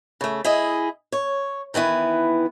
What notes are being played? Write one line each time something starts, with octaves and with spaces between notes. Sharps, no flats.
C#3 A3
E4 G#4 D#5
C#5
D#3 E3 B3 E4